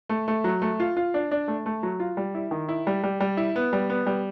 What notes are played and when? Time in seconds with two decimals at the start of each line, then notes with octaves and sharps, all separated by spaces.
0.09 A3
0.28 A3
0.44 F#3
0.62 A3
0.80 F4
0.97 F4
1.14 D4
1.31 D4
1.48 A3
1.66 A3
1.83 F#3
2.00 F4
2.17 G3
2.35 E4
2.51 D#3
2.69 E4
2.87 G3
3.03 G3
3.20 G3
3.37 E4
3.56 B3
3.73 G3
3.90 B3
4.06 G3